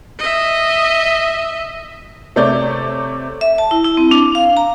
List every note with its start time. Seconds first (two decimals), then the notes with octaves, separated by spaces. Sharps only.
0.19 D#5 E5
2.36 C3 A3 C#5 D5 G6
3.41 E5
3.58 A5
3.71 E4
3.85 E4
3.97 C4
4.11 D4
4.35 F5
4.57 A#5